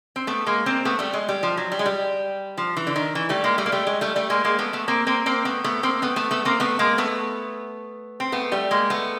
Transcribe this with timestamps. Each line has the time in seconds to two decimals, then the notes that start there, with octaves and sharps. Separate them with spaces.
0.16 C4
0.27 A3 B3
0.46 G#3 A#3
0.66 A#3 C4
0.85 A3 B3
0.99 G3 A3
1.13 G#3
1.28 G3
1.43 F3
1.57 F#3
1.72 G3
1.79 G#3
1.86 G3
2.58 F3
2.77 E3
2.87 D3
2.96 D#3
3.15 E3
3.29 G3 A3
3.44 G#3 A#3
3.58 G3 A3
3.66 A#3
3.72 G3 A3
3.87 G#3
4.01 G3 A3
4.16 G3 A3
4.30 G#3 A#3
4.44 G#3 A#3
4.58 A3 B3
4.73 A3 B3
4.88 A#3 C4
5.07 A#3 C4
5.26 A#3 C4
5.45 A3 B3
5.64 A3 B3
5.83 A#3 C4
6.02 A3 B3
6.16 A3 B3
6.31 A3 B3
6.45 A#3 C4
6.60 A3 B3
6.79 G#3 A#3
6.98 A3 B3
8.20 C4
8.32 A3 B3
8.52 G3 A3
8.71 G#3 A#3
8.90 A3 B3